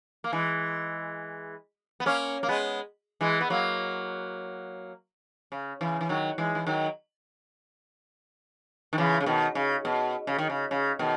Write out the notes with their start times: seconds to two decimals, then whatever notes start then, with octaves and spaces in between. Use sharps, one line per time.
0.24 A#3
0.33 E3 G#3
2.00 B3
2.06 A#3 C#4
2.43 A#3
2.48 G#3 B3
3.21 E3 G#3
3.41 B3
3.50 F#3 A#3
5.52 C#3
5.81 C#3 E3
6.01 E3
6.09 D#3 F#3
6.38 E3 G#3
6.55 E3
6.67 D#3 F#3
8.93 D#3
8.98 C#3 E3
9.21 C#3
9.26 B2 D#3
9.55 C#3
9.85 B2
10.27 C#3
10.38 D#3
10.50 C#3
10.71 C#3
10.99 B2 D#3